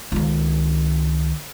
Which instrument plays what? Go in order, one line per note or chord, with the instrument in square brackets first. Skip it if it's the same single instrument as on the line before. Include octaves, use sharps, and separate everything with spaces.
[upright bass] C#2 D#3